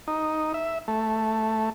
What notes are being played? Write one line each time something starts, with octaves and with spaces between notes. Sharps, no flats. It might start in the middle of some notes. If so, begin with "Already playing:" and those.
D#4
E5
A3